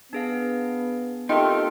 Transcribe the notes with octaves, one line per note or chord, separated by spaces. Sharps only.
B3 D4 G#4 F5
A3 C4 D#4 F4 G4 A#4 G5